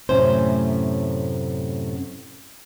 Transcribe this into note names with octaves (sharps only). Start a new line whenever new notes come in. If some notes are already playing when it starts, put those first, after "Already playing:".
F#2 A2 C3 A3 C#4 C5